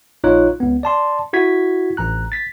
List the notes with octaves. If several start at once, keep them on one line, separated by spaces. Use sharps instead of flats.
A#1 D#4 F4 C#5 F#6
C#2 B3
D5 A5 C6
E4 F#4 G#6 B6
A1 A#5 F#6
A6 B6